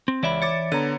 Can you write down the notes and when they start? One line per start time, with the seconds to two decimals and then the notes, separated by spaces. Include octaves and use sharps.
0.08 C4
0.23 C#2 E3 C#5 D5 E5 B5 E7
0.42 C#5 D6 A6 C#7
0.72 D3 B3 C#5 A#5 D#7